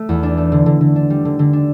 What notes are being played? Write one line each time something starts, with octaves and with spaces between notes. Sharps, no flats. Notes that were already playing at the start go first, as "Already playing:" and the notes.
Already playing: A3
E2
D4
A3
D3
D3
D3
D4
G3
D3
D3
D4